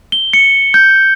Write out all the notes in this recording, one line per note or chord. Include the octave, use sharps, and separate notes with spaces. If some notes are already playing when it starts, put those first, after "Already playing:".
G7
C#7
G6